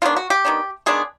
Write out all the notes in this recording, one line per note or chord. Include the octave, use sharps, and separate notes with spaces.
D#3 G#3 B3 D4 F4
F#4
G4
D#3 G#3 B3 D4
D#3 G#3 B3 D4 G#4